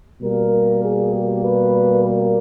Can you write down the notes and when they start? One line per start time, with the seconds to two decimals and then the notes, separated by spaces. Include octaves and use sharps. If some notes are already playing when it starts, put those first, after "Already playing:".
0.22 B2 G3 A#3 A#4
0.82 G#4
1.12 G4
1.42 B4
2.03 A#4